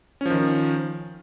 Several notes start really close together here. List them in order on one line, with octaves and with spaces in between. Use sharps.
C#4 F3 D#3